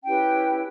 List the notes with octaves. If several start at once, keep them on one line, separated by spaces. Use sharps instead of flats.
C#4 E4 G4 B4 G5